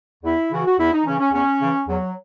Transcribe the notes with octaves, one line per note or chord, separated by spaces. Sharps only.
E2 E4
C#3 E3 F#4
F#4
E2 E4
D#4
C#3 E3 C#4
C#4
E2 C#4
C#3 E3
E2 F#3